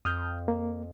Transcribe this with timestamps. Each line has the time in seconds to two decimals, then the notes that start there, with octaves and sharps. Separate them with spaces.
0.05 F2 D#6 F6 G6
0.48 A#3